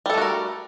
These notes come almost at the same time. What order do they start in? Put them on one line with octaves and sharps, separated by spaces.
G3 A4 A3 F#4 A#4